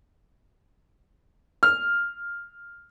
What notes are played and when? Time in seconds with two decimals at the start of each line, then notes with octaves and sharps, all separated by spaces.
1.63 F6